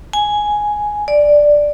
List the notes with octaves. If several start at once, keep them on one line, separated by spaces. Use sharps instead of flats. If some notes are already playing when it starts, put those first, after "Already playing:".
G#5
D5